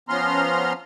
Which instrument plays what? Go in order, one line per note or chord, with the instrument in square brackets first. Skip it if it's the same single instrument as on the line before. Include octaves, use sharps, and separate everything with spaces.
[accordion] F3 B3 C#4 A#5 C6 F6